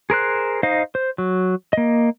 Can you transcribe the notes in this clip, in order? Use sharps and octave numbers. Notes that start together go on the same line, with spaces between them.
G#4 A#4 C5 F#6
D#4 C5 D#5 F5
C5
F#3
A#3 D#5